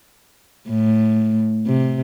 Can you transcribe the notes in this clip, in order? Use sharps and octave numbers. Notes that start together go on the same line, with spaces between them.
A2
C3